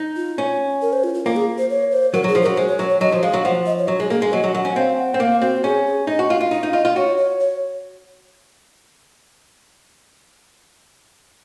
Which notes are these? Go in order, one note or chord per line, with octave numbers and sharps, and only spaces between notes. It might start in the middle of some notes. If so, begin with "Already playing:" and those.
Already playing: D#4
F4
C#4
A#4
C5
F4
F4
A#3 F4
G#4
C5
C#5
C5
F#3 A#4
F#3 G#4
F3
F#3 A#4
G#3 C5
C#5
F#3 C#5
C#5
F#3 D#5
F3
G#3 F5
F#3
F3 F#5
D#5
C#5
F#3
G#3 G#4
A#3 G#4
G#3 G#4
F#3 D#5
F#3
F#3 F#5
C#4
C4 F5
F#5
C4
A#3 F5
C4 F#4
C#4 G#4
G#4
D#4 D#5
F#4
F4
F4
D#4 F5
D#4
F4 D#5
F4
F#4 C#5
C#5
C#5